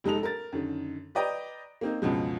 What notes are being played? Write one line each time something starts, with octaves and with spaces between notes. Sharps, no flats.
F1 G#3 D#4 A4 F7
A#4 A6
F#2 D3 D#3
B4 D5 D#5 G5 A#5
A#3 C4 D#4
C#2 F#2 B2 F3 G#3